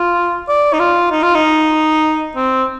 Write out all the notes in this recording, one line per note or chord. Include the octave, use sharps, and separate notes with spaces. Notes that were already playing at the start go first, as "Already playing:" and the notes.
Already playing: F4
D5
D#4
F4
D#4
F4
D#4
C4